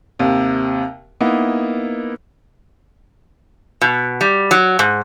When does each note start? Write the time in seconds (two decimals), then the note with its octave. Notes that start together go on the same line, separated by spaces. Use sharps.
0.19 D#2 C3
1.21 A#3 B3 D#4 E4
3.81 B2
4.21 G3
4.51 F#3
4.79 G#2